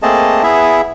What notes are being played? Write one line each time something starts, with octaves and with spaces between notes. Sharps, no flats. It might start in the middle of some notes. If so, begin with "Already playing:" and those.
A3 A#3 C4 G#4 D#5 A5
B3 E4 G#4 E5